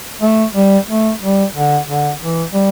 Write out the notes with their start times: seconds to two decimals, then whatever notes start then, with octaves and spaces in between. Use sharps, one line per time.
0.22 A3
0.55 G3
0.88 A3
1.22 G3
1.55 D3
1.88 D3
2.21 E3
2.53 G3